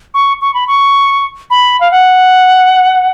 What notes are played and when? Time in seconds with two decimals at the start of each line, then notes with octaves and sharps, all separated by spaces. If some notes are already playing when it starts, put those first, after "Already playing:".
0.14 C#6
0.41 C#6
0.54 B5
0.67 C#6
1.50 B5
1.81 F5
1.91 F#5